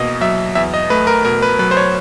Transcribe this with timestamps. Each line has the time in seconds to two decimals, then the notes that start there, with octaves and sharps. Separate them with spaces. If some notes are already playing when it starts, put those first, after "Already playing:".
Already playing: E2 B2 A#3 D#5
0.21 F#3 E5
0.55 E2 E5
0.74 D#5
0.90 A3 B4
1.07 A#4
1.25 B2 A#4
1.42 B4
1.59 F#3 B4
1.71 C5
1.77 C#5